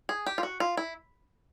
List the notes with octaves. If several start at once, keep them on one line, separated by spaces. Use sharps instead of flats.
G#4
G4
F4
F#4
F4
E4